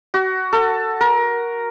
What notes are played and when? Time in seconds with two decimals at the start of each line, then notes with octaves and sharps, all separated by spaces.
0.14 F#4
0.53 A4
1.01 A#4